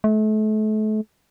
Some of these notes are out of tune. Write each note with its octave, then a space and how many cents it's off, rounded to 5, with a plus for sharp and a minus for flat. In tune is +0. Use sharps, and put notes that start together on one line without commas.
A3 -35